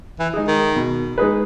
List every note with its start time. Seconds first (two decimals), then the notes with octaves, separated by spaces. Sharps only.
0.20 E3
0.33 G#3 D#4 G#4
0.48 D#3
0.76 B2
1.18 G#3 D#4 G#4 B4